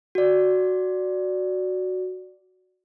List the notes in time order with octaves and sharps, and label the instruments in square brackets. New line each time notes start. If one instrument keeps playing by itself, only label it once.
[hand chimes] F#4 D5